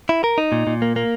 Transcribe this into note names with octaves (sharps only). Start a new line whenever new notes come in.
E4
A#4
D#4
A#2
A#2
A#3
A#3